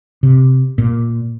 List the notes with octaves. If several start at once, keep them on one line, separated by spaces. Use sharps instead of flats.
C3
A#2